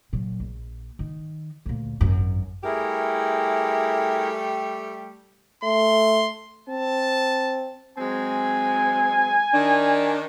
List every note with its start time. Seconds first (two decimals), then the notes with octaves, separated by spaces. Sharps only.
0.13 A#2 F#3
0.40 A#1
0.99 D#3
1.66 D2 A#2
2.01 G#1 F#2
2.64 G3 A3 E4 G4 G#4 A#4
5.64 A3 C6
6.69 C4 A5
7.98 F#3 G#3 C4 G#5
9.53 D#3 D4